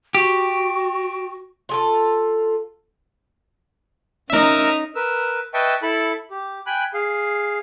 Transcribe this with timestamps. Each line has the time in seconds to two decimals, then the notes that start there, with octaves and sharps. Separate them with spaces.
0.15 F#4 G4
1.69 F4 G#4 A4
4.30 C#4 D#4 A#4 E5
4.95 A#4 B4 E6
5.54 B4 D#5 E5 G5 A5 C#6
5.82 E4 A4 A5 B5
6.31 G4
6.66 G5 G#5 B5 F#6
6.94 G#4 F5